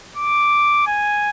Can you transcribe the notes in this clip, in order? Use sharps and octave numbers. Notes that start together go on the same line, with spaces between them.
D6
G#5